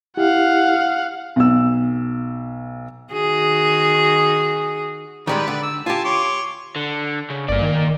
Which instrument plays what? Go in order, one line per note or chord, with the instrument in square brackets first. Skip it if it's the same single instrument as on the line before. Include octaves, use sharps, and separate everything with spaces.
[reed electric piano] E4 G4 [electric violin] F5 F#5
[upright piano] B1 E6
[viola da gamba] D#3 F#4 G#4
[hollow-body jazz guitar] D#3 G3 G#3 [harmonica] B3 B4 D5
[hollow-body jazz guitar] D3
[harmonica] E6
[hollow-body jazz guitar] F4 G4 [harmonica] G#5 A5
[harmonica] C#5 C6 D6
[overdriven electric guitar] D3
C#3
[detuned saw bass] G1 [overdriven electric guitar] A#3 D5
[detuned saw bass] D#3